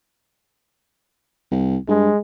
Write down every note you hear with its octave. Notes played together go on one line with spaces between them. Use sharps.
C2
G2 G#3